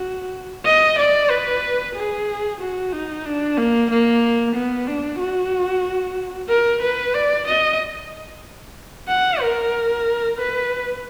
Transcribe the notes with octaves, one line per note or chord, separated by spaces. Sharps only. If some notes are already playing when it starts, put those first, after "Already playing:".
Already playing: F#4
D#5
D5
B4
G#4
F#4
D#4
D4
A#3
A#3
B3
D4
F#4
A#4
B4
D5
D#5
F#5
A#4
B4